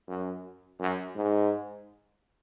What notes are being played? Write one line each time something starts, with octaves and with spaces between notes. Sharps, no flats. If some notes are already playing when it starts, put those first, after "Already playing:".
F#2
F#2
G#2